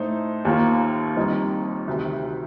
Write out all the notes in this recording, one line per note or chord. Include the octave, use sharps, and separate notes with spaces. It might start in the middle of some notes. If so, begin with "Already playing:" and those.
Already playing: A2 A3 D#4 A4 C5
D#2 D#3 A#3 F4
F2 D#3 G3 C4 D#4
D2 C3 D#3